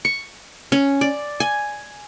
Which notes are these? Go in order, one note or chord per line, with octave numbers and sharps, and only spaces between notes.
C#6
C#4
D5
G#5